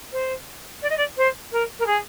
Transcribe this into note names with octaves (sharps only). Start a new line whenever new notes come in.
C5
D5
D#5
D5
C5
A#4
A#4
G#4